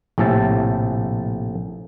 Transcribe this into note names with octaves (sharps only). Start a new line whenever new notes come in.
A#1 A2 C3 A4 A5